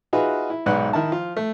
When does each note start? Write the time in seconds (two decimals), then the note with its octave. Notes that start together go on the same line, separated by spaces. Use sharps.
0.13 D#4 F4 F#4 G#4 B4 E5
0.50 E4
0.66 B1 G#2 B4 D5 F#5 F#6
0.93 D#3 E4 A5
1.11 F3 F4
1.37 A3